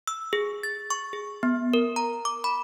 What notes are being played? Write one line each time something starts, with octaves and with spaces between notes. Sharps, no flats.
E6
G#4
A6
C#6
G#4
B3
A#4
A#5
D6
B5